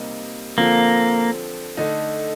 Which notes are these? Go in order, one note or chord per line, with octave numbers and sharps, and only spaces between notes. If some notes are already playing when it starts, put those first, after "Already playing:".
Already playing: C3 G3 A#3 D#4
D3 F3 A#3 C4
D3 A3 D#4